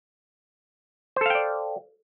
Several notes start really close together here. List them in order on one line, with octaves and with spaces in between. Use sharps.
C5 A4 F5 G5 D5